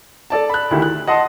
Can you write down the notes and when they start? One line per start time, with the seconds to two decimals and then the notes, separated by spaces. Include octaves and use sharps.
0.30 A4 D5 A5
0.50 B5 F#6
0.71 D2 D#3 E4 G4
0.82 F#6
1.07 D#5 F#5 A5 C6 D#6